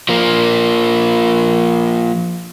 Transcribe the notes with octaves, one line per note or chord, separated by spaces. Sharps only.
F3 A#3